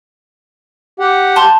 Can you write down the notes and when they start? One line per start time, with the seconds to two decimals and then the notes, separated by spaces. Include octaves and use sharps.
1.00 G4 F#5
1.36 A5 C6 G6